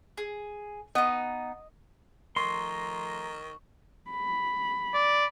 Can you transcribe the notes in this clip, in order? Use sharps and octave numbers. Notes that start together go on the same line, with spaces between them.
G#4
B3 D#4 D#5
D#3 F3 A3 A#5 C6 C#6
B5
D5